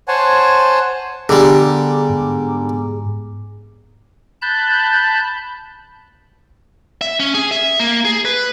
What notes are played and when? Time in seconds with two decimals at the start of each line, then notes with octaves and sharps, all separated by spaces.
0.08 C5 C#5 F#5 G#5 A5
1.29 D3 G3 B3 G#4 G#5 A#5 D6
2.10 G#2
4.42 A5 B5 F#6 G6
7.01 E5
7.20 C#4
7.34 G#4
7.51 E5
7.80 A#3
8.05 G#4
8.25 B4